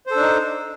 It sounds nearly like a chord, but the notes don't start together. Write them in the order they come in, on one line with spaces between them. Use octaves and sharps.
C5 A4 D4 D#4